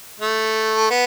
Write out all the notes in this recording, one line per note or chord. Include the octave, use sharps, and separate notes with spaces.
A3
B3